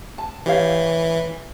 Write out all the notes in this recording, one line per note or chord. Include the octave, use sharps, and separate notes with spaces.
A5
E3 G4 C#5 F5